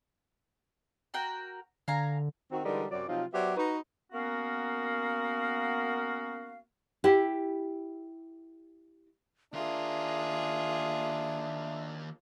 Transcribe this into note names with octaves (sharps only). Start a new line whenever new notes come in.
F#4 A#4 G5
D3 F5 G#5 A#5
D#3 C4 F#4
D3 E3 G3 G#3 D#4 A#4
F#2 C3 F#3 D5
C3 F3 F#3 D#4 F4
F#3 B3 G4 C5 D5 E5
D#4 F#4 B4
A#3 B3 C#4 F#4 A#4 F5
E4 G4
D#2 D4 F4 G#4 A#4 E5